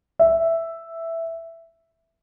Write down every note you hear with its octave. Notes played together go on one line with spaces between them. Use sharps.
E5